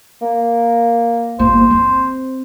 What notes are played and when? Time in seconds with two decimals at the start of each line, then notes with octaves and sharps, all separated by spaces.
0.22 A#3
1.39 G1 A#3 C5
1.70 C4